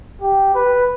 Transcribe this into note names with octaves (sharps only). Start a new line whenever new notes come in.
G4
B4